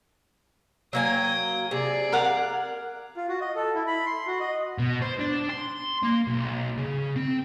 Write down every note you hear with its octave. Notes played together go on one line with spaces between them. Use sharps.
F#3 A#3 G5 G#5 D#6
C3 G#4 D5
A#4 F5 F#5
F4
F#4
D#5
A4
E4
B5
C6
F#4
D#5
B2
C5
D4
C6
A#3
B1
C#3
C4